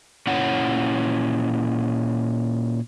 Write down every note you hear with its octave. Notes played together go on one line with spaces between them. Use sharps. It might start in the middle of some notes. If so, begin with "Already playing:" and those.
A#2 C#4 E4 C#5 F#5